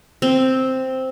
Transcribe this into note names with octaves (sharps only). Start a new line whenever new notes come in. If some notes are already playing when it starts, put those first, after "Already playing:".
C4